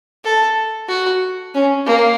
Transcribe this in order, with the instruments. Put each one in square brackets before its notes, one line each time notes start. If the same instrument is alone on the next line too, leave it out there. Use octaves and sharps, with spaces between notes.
[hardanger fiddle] A4
F#4
C#4
A#3